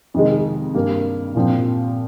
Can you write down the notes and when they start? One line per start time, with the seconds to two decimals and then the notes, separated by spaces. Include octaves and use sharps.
0.14 F2 C3 D#3 G#3
0.74 G2 G3 A#3
1.35 A#2 F3 C4